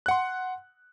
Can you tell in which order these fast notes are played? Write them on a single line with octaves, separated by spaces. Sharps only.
F#6 F#5 C6